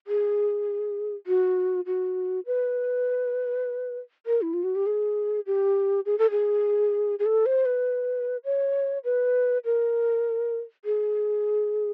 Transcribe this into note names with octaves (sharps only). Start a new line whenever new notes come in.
G#4
F#4
F#4
B4
A#4
E4
F4
F#4
G4
G#4
G4
G#4
A4
G#4
G#4
A4
C5
B4
C#5
B4
A#4
G#4